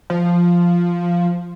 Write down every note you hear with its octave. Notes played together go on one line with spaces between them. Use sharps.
F3